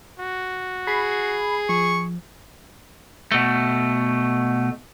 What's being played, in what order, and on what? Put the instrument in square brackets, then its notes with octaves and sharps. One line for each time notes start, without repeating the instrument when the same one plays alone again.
[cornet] F#4
[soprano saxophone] G#4 [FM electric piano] B5 C7
[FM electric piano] F3 [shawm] C#6
[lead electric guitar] B2 A3